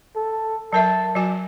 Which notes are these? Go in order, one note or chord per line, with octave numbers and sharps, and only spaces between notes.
A4
F#3 A#4 E5 A5
F#3 F#4 G#5